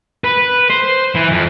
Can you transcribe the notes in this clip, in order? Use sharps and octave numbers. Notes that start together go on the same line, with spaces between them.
B4
C5
E3
F2